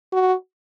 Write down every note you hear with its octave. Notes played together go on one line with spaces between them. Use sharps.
F#4